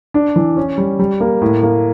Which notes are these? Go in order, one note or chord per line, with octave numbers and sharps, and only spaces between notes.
D4
E3
C#4
G3
G3
A#3
A2
A#3